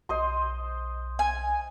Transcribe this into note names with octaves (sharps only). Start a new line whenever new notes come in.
B1 C5 D#5 C6
G#5